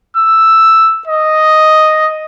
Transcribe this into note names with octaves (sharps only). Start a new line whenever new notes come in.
E6
D#5